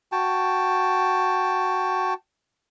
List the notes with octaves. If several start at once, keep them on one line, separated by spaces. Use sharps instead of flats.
F#4 G5 A5